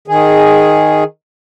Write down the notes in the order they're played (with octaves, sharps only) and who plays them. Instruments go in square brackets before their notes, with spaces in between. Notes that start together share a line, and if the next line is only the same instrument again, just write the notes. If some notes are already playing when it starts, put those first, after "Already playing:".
[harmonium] D#3 G#4